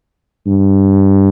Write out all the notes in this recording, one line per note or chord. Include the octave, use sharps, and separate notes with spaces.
G2